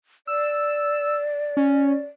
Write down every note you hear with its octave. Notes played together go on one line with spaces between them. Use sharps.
D5 E6
C#4